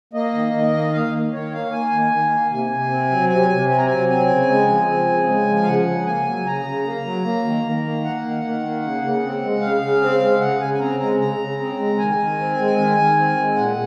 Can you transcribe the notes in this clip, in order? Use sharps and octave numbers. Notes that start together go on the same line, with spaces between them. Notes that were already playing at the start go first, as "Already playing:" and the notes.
A#3 D#5
D#3
D#3
A#3
A#3 F5
D#3
D#3 C#5
A#3 F5
A#3 G#5
D#3
D#3
A#3
C3 G#5
C3
C4
F#3
C3 G#5
C3
C4 G#5
A#5
F#3 G#5
C4 G#5
C#3
G#3
F3
C4
C#3
G#3
F3
F5
C#3 F#5
C#3
A#3 G#5
F#3
C#3 A#5
C#3
A#3
F#3
A#3
D#3
D#3
A#3
A#3 F#5
D#3
D#3
A#3
C#3
C#3
C4
G#3
C#3 F5
C#3
C4
G#3
C#3 F#5
C#3 G#5
G#5
C4 A#5
G#3 A#5
C#3 A#5
C#3
C4
G#3
D#3 G#5
D#3
C4
G#3
D#3
D#3
C4
G#3
A#2 F#5